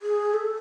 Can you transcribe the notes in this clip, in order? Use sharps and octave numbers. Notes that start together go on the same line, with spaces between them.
G#4
A4